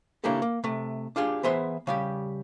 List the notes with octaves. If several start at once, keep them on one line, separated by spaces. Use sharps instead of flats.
C#3 A#3 D4 E4 G4 A4
A#3
C3 A3
D4 F4 G4 G#4
E3 B3 G#4 C5 E5 C6
C#3 G3 G4